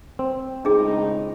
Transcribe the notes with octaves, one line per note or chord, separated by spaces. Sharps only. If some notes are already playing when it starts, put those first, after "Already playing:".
C4
C#2 A2 D4 D#4 G#4